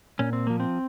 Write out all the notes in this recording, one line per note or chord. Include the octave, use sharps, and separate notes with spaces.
A#2 C#4
C4
F3 A#3
C4